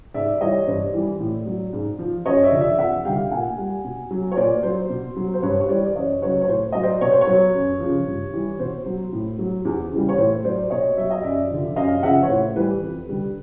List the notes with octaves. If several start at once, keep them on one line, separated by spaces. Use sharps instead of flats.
G#2 D5 E5
E5
E3 G3 C#5 D#5
G2 C5 D5
E3 G3
A2
F#3
G#2
F3
F#2 C#5 D#5
D5 E5
D3 F3
D5 E5
F2 E5 F#5
D3 G3 F5 G5
A#2 F#5 G#5
G3
B2
F#3
C#5
A#2 C5 D5
F#3 C5
B2
F#3
C5
G2 B4 C#5
C#5
E3 G3 C5 D5
D5
F#2 C#5 D#5
C#3 F#3 B4 C#5
C#5
A2 C5
F#3 D#5
C5 D5
B2 C#5
C5
B4 C#5
F#3
F#2
C#3 F3
G2
E3 G3
B2 C5
F#3
A2
F#3
E2
C#3 E3 G3
C#5
A2 C5
F#3 C5 D5
B2 C#5 D#5
F#3 E5
D#5
F#2 D5 E5
D3 F3
F#2 D#5 F5
C#3 F3 E5 F#5
C#5
A2 C5
E3 G3 B4
F2
D3 G3